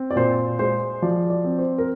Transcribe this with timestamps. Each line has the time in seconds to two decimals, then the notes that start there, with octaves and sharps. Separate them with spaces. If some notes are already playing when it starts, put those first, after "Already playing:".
Already playing: C4
0.11 D5
0.16 A#2 C5
0.59 G#3 C5
1.02 F3 D5
1.30 D5
1.44 C4
1.59 C5
1.78 A#4